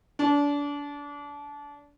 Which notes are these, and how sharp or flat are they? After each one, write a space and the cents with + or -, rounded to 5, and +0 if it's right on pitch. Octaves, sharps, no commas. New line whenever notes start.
D4 -30